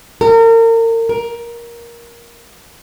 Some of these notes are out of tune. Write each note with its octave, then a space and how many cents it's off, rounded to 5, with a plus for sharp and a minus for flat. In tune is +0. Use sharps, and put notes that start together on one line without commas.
A#4 -35
A#4 +15